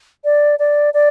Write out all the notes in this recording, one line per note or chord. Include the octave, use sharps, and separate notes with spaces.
D5
D5
D5